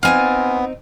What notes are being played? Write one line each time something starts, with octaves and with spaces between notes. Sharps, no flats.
B3 C4 D#4 F4 G#5 A#5